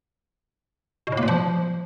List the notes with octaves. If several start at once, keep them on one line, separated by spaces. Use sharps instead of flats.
B2
A2
A#3
A#2
F3